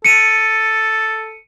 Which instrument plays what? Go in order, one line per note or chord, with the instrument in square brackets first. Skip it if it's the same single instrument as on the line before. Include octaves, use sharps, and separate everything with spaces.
[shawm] A4 [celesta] C#7 D#7